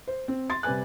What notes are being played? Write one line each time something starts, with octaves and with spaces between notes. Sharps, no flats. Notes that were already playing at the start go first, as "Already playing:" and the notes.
C5
C4
C6 A6
C3 G3 B4 G#5 F#6